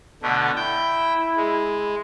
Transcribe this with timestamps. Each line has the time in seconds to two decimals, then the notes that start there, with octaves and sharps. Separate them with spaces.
0.22 B2 D3 A3
0.56 E4 G5
1.37 G#3